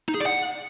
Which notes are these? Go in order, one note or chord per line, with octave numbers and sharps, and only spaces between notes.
D#4
G#4
D5
F#5